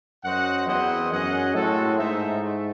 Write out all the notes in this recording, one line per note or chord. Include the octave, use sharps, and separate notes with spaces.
F#2 F#4 C5 D#5 F#5
E2 C4 E4 C5 D#5 F#5
F#2 C#4 G#4 D#5 F#5
A2 G#3 C4 F#4 A4
G#2 D#4 A4 C5 E5
A3